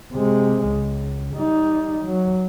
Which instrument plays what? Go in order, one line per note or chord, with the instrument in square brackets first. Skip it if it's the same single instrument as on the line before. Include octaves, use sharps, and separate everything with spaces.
[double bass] C3 G#3
C#2
G3 D#4
F#3